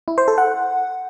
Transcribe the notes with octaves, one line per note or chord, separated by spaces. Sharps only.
E4
C5
A4
F#5